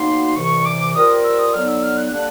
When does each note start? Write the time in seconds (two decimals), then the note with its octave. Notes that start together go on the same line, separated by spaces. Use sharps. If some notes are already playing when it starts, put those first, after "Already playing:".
Already playing: B2 F#3 A#3 D#4 C6
0.36 C2 C3 E3 C#6
0.65 D6
0.94 G3 C4 F4 A#4 D#6
1.24 E6
1.39 D#6
1.53 D3 F#3 B3 D#4 F6
1.68 E6
1.83 F6
1.97 F#6
2.11 D3 G3 A#3 D4 F#6